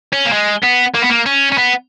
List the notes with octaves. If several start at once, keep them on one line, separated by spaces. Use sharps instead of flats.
C#4
A#3
G#3
B3
A#3
B3
A#3
C#4
C#4
B3